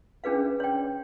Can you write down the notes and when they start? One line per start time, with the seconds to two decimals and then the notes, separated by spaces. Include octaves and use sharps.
0.24 C#4 D4 G#4 B4 F5
0.60 C#5 G5